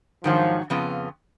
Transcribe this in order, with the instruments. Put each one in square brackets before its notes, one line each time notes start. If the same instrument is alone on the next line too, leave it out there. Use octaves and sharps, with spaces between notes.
[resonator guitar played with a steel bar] G#2 D#3 F#3 [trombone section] F3
[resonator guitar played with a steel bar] F2 C#3 F3 B3 F4